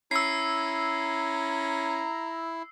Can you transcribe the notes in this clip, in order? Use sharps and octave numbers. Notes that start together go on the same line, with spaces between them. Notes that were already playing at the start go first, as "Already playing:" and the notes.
C#4 E4 A#5 E6 C7